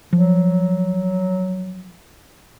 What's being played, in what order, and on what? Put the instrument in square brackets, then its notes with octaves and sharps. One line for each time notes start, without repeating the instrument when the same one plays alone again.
[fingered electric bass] F3 [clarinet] F#3